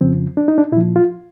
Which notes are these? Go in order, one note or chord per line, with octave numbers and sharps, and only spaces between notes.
F2 C#3 F3 C4
D4
D#4
D4
A#2 E4
F3
F4